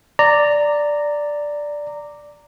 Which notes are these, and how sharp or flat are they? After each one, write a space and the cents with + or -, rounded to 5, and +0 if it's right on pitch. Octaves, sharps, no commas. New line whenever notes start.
D5 +0 A#5 -15